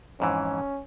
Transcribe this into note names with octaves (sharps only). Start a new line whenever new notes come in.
F2 G#2 E3 C#4